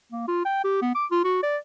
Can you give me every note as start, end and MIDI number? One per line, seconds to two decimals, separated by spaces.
0.12 0.23 58
0.28 0.41 65
0.45 0.60 79
0.64 0.77 67
0.82 0.93 59
0.95 1.06 86
1.11 1.20 65
1.24 1.41 66
1.43 1.57 74